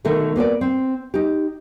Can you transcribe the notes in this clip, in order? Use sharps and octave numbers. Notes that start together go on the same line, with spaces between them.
B2 D3 D#3 A3 A#4
A#3 B3 A#4 D5
C4
D#4 G4